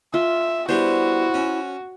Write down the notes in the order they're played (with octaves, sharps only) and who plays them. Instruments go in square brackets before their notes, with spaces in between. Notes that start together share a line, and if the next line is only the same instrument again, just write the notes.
[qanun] F4 [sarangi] E5
[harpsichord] G3 B3 D4 [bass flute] E4 [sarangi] F#4 [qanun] C5
[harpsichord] C#4